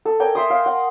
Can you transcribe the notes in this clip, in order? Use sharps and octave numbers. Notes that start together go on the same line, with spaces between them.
A4
A#4 D5 G5 G#5
E5 C6 D#6
F5
F#5